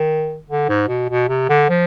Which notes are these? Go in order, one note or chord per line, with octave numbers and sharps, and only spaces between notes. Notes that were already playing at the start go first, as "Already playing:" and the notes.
Already playing: D#3
D3
G#2
B2
B2
C3
D3
F3